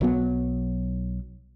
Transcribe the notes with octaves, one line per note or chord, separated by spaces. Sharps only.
B1 F#3 B3